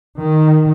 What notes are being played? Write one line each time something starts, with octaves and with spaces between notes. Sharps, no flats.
D#3